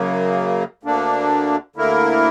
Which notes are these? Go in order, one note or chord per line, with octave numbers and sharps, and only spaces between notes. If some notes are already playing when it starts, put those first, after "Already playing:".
Already playing: F#2 C#3 F#3 A#3
D2 D3 A#3 D4
D2 D3 A#3 E4 A#4